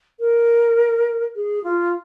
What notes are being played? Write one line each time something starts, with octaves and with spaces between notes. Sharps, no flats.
A#4
G#4
F4